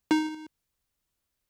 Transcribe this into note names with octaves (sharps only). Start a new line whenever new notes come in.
D#4